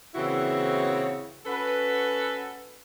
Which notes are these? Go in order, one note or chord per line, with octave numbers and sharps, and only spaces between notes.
A#2 C#3 E3 C4 E4 F#4
C#4 F#4 A4 B4